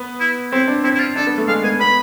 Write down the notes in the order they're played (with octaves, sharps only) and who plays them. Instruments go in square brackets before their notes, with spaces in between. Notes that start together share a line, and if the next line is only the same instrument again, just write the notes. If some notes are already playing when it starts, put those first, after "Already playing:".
Already playing: [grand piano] B3
[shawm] E4
[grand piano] C4 [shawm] E4
[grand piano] D4
[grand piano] C4 [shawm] E4
[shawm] E4
F4
[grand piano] D4 [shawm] A4
[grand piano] B3
A3
[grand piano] G#3 [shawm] F5
[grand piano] B3 [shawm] G#5
[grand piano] B3 [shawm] B5